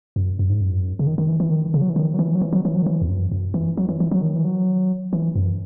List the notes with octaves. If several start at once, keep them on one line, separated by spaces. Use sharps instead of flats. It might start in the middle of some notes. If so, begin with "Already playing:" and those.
F#2
F#2
G#2
F#2
C#3
D#3
D#3
E3
E3
D#3
C#3
F#3
E3
D#3
F#3
E3
F#3
E3
F#3
E3
F#3
D#3
E3
E2
F#2
F#2
E3
F#3
E3
E3
F#3
D#3
E3
F#3
E3
F#2